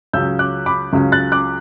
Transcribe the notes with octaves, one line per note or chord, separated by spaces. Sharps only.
C#2 C#3 F#3 C#4 E6 G6
D6 F#6
B5 D6
C#2 C#3 F#3 C#4
F#6 A6
D6 F#6